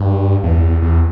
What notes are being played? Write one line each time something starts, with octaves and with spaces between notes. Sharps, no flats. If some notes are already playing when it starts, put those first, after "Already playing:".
Already playing: G2
E2
E2